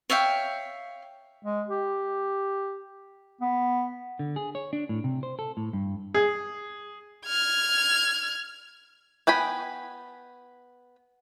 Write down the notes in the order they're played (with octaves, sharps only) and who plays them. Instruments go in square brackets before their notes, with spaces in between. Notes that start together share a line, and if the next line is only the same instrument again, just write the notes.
[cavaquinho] C#5 E5 F5 G5
[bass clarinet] G#3
G4
B3
[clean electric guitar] D3
G#4
C#5
D4
A2
C3
C5
A4
A2
G2
[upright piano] G#4
[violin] F6 G#6
[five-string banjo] B3 G5 G#5 B5